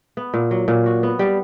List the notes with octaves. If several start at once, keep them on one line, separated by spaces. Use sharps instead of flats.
B3
A#2
F#3
A#2
F#4
B3
G3